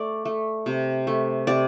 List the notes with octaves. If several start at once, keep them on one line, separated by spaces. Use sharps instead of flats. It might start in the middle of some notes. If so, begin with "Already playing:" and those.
Already playing: A3 D5
A3
C3
A3
C3 D5